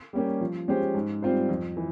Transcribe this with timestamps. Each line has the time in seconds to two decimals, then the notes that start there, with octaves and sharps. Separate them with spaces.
0.13 G3 A#3 C#4 G4
0.41 F3
0.68 G#3 C#4 G4 C5
0.94 G#2
1.22 G3 C4 F4 C5
1.49 F2
1.77 E3